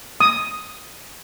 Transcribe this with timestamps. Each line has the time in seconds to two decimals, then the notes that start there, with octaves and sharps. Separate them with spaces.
0.20 D#6